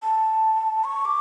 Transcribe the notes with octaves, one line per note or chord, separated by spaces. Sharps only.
A5
C#6
D6